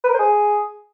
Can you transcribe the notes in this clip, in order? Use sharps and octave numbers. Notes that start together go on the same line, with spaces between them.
B4
A#4
C5
G#4